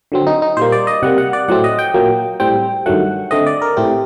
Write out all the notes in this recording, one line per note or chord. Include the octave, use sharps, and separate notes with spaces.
D3 F#3 C4
D#4
D#4
A#2 G3 A#3 C5
D5
D#5
C3 G3 A#3 F#5
F#5
D5
A2 F#3 A3 C4 F#5
D#5
G5
A#2 F#3 A#3
A2 G3 C4 G5
G2 D#3 F#3 A3 F#5
D3 A3 C4 D#5
D5
A#4
A2 A3 C4 G4